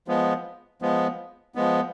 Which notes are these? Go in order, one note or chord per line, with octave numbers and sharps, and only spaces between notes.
F3 G#3 B3
F3 G#3 B3
F3 G#3 B3